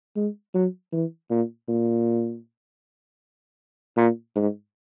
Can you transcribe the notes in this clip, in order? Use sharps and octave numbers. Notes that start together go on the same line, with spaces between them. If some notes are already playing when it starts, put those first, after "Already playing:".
G#3
F#3
E3
A#2
A#2
A#2
G#2